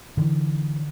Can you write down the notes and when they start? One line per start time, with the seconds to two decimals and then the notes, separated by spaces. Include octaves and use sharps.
0.17 D3 E3